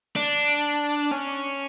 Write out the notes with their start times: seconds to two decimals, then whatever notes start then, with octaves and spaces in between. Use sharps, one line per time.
0.16 D4
1.11 C#4